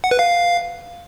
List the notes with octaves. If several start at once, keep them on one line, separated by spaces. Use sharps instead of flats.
F#5
B4
F5